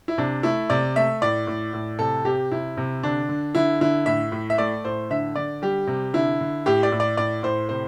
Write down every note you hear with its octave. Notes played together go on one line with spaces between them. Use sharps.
E4
C3 D4
A3 E4
C3 D5
A3 E5
A2 D5
A2
A2
C3 A4
C3 G4
C3 E4
C3
D3 D4
D3
D3 E4
D3 E4
A2 E5
A2
E5
A3 D5
A2 C5
D3 E5
D3 D5
G3 G4
C3
D3 E4
D3
A2 G4
D5
A2
D5
A2 D5
A2 C5
C3 C5